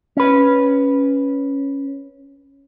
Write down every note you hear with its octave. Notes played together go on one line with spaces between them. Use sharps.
C#4 B4